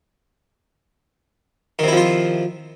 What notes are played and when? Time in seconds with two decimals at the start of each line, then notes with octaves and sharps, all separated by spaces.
1.79 D#3
1.84 C3
1.88 E4
1.93 F3
1.97 F4